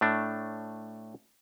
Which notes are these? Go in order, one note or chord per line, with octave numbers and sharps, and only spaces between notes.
A2 A3 D4